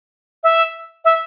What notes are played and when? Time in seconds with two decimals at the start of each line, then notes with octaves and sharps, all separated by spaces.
0.43 E5
1.05 E5